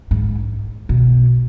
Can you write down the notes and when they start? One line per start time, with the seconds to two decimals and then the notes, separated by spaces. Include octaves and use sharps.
0.11 G#2
0.89 B2